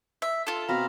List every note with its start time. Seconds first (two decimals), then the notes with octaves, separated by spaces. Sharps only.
0.22 E5
0.47 F4 A4
0.69 B2 C4 F5 A#5 B5